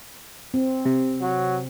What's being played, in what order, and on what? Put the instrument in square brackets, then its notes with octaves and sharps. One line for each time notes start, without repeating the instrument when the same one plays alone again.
[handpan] C4
[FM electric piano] C3
[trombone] F#3